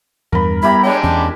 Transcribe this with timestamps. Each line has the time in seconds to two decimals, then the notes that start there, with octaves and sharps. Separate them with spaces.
0.32 E2 G2 A#4 B5
0.63 G3 B3 E4 G4 E5 A#5 B5
0.83 G#3 D4 C#5 G5
1.03 E2 C#4 A5